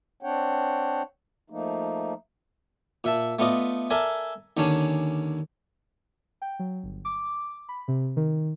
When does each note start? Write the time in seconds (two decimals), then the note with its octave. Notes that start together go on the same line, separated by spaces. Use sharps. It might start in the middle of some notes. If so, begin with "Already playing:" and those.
0.23 C4 D4 C#5 F#5 G5
1.50 F3 A3 A#3 D#4
3.04 A#2 E5 A5
3.39 A3 B3 F4 D5 D#5
3.90 A4 A#4 D5 E5 G#5
4.57 D#2 D3 C#4 D4 G#5
6.42 G5
6.59 F#3
6.83 G1
7.05 D6
7.69 B5
7.88 C3
8.16 D#3